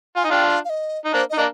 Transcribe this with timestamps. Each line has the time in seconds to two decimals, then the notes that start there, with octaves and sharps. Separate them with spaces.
0.16 F4 G#5
0.24 D#4
0.31 D4 F4 G5
0.48 F5
0.65 F5
0.70 D#5
1.05 D#4
1.13 A#3 D4 C5
1.30 D#4 D#5
1.38 A#3 D4